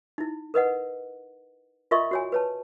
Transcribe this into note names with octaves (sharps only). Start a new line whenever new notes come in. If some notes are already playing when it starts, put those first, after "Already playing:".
D#4 E4
A#4 B4 D#5 F#5
F4 A#4 D#5 E5 C6 C#6
F#4 C#5 G#5
B4 C#5 A5